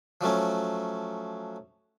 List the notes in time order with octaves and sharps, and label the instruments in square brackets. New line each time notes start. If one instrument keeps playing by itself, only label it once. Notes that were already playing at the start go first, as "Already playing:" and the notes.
[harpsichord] F3 F#3 A3 C#4